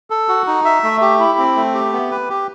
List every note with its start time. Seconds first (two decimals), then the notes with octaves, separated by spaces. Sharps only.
0.10 A4
0.29 F#4
0.47 D#4
0.65 E5
0.83 A3
1.01 G4
1.20 E4
1.38 C4
1.56 A3
1.74 G4
1.93 B3
2.11 B4
2.29 G4